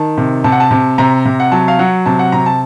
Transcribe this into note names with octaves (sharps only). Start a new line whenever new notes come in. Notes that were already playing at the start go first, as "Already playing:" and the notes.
Already playing: D#3 A5
C3
C3 A5
F#5
A5
C3
C3 A#5
C3
F#5
F#3 A5
F5
F#3 F#5
C3 A5
F#5
C3 A#5
A5